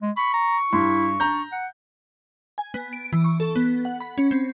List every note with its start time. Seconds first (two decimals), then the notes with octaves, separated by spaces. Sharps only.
0.02 G#3
0.17 B5 C#6
0.34 A#5
0.73 G2 E4 C6
1.20 D4 A#5 G6
1.52 F#5
2.58 G#5
2.74 B3
2.93 D7
3.13 E3
3.24 C#6
3.40 A4
3.56 B3
3.85 F#5
4.00 B5
4.18 C#4
4.31 C4